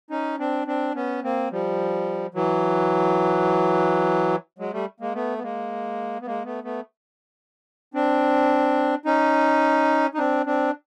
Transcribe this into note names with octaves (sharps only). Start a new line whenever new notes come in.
C#4 D#4
C4 D4
C4 D4
B3 C#4
A#3 C4
F3 G3
E3 F#3
F#3 G#3
G3 A3
G#3 A#3
A3 B3
B3
G#3 A#3
B3
G#3 A#3
A3 B3
A3 B3
C4 D4
C#4 D#4
D#4
C4 D4
C4 D4